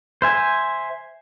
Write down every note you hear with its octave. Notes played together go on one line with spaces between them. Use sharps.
C5 E5 G#5